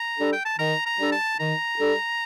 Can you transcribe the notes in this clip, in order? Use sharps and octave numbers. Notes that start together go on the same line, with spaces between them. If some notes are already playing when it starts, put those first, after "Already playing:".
Already playing: A#5
G3 D4 A4
G5
A5
D#3 A#5
A#5
G3 D4 A4
A5
D#3 A#5
G3 D4 A4